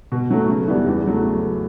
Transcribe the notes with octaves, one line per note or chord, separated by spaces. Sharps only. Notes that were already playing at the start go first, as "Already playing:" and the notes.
B2
F#3 A3
C#3
E3 G3 B3 D4
E2
C#3 F#3 A3